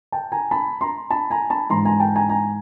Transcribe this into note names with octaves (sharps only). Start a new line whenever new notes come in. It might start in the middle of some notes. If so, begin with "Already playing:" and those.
G5 A5
G#5 A#5
A5 B5
A#5 C6
A5 B5
G#5 A#5
A5 B5
G#2 E3 G#3 A#5 C6
G#5 A#5
G5 A5
G#5 A#5
G#5 A#5